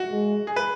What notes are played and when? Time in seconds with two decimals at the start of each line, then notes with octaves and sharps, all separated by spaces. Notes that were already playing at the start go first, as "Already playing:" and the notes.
Already playing: F#4
0.10 G#3
0.47 G#4
0.56 B4